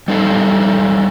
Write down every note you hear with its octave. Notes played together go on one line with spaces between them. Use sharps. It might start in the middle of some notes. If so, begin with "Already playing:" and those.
G3 D#4 A4 F5